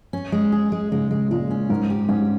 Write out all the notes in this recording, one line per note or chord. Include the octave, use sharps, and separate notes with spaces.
C#4
G#3
G#4
G#3
C#3 G#3
G#3
A#2 G#3
C#4
G#2 A#4
G4
G#2 C#4